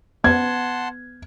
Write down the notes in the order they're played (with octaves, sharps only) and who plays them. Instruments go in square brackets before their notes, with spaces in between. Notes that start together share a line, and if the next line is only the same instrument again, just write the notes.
[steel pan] B3 [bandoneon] F#5 A5 C6 [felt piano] G#6